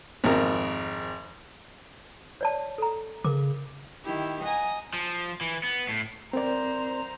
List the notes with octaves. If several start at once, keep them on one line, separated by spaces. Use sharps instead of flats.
G#1 F2 A#4
C#5 D5 A5
A4 A#5
C#3 A#4 D6
D#3 E4 G4
D#5 F#5 G#5 A#5
F3
E3
B3
A2
C4 A#4 C5 D5 A#5